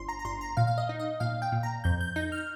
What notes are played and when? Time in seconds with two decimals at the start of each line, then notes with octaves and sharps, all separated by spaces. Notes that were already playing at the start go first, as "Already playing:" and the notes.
Already playing: G1 C6
0.09 A#5
0.19 A#5
0.25 G1 C6
0.41 A#5
0.57 A#2 F5
0.67 F5
0.78 D#5
0.89 D#4
1.00 D#5
1.20 A#2 F5
1.42 G5
1.52 A#2
1.63 A#5
1.84 F2 G6
2.01 G6
2.16 D#4 G6
2.32 F6